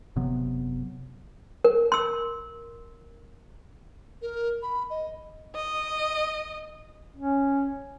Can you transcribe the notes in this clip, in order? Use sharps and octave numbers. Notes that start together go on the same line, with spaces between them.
F#1 C3 F#3 B3
A#4
C6 E6
A#4
B5
D#5
D#5
C#4